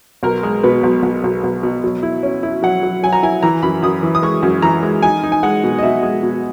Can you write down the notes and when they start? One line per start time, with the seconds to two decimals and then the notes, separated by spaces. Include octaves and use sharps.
0.23 B1 A#4
0.43 G#3
0.63 B2 B4
0.83 B1
1.03 B1
1.24 B1
1.44 B1
1.63 B2
1.84 F#3
2.03 E4
2.23 C#4
2.43 E4
2.63 F#3 F#5
2.83 F#3
3.03 F#3 G#5
3.13 A#5
3.23 E4 G#5
3.43 E3 A#5
3.63 F#2 B5
3.83 F#2 D#6
4.03 E3
4.15 D#6
4.22 G#3 C#6
4.43 F#2
4.62 E3 A#5
4.83 G#3
5.02 D#4 G#5
5.23 D#4
5.32 G#5
5.43 G#3 F#5
5.64 B2
5.78 D#5
5.83 B2 E5
6.03 G#3
6.23 B2